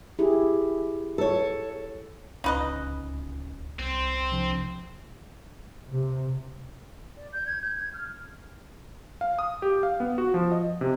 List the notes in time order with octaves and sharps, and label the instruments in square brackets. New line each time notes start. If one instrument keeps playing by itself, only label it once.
[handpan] E4 G4 G#4
[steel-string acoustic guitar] A4 C#5
[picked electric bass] D1 C#4 [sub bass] C#2 [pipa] D#4 B4 D#5
[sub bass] C2 [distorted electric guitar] C4
[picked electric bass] C3 F3 D4
[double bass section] C3
[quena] D5
G6
G#6
G6
G#6
F6
[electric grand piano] F5
D#6
G4
F5
B3
F#4
F3
D#5
C3